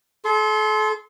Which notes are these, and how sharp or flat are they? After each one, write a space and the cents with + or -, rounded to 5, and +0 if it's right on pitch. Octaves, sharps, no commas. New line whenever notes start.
A4 -40 C6 +0